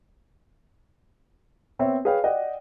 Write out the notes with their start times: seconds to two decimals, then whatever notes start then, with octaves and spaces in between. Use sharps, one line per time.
1.79 B3 C4 C#5 E5
2.05 G#4 B4 C#5 F5 G5
2.24 D5 D#5 F#5 G5